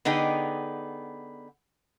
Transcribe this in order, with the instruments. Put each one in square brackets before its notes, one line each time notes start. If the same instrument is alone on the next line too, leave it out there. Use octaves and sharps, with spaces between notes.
[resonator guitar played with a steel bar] D3 B3 D#4 G#4 G5